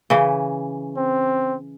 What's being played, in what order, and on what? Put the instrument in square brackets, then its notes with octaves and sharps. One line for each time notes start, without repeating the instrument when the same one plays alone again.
[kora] C#3 E3
[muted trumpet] C4